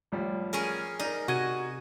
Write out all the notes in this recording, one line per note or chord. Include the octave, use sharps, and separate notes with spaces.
A1 F3 G3
C#4 G#4 A#4
D#4 A#4 D5
C3 F#4 D#5 G#6 D#7